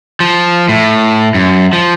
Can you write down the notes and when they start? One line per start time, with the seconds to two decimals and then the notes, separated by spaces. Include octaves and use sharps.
0.20 F3
0.69 A2
1.34 F#2
1.73 F3